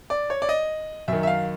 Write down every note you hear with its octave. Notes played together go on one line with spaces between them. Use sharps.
D5
C#5
D5
D#5
F#2 D#3 E5
E5
F5